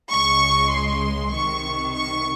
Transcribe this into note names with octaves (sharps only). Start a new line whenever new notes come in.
C#2 C#3 G#3 C#6
C6
C2 C3 D#3 C#6
C#6